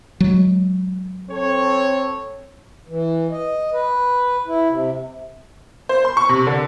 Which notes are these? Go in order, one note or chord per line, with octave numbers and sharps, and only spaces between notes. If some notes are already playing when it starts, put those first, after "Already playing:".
F#3 G#3
C4 A4 C#5
E3
D#5
B4
E4
C3
C5
C6
C#6
C3
D3